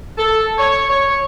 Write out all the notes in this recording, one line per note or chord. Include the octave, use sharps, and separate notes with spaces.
A4
C#5
C#5